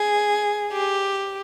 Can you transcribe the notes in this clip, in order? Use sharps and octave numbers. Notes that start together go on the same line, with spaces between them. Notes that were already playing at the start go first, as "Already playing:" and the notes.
Already playing: G#4
G4